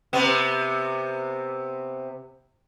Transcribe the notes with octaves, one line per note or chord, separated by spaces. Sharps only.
C3 B3